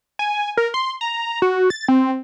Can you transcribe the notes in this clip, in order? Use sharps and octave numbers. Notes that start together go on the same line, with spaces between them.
G#5
A#4
C6
A#5
F#4
A6
C4